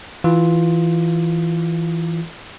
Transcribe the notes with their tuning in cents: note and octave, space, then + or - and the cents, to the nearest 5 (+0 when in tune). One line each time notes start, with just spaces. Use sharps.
E3 +0 F4 +0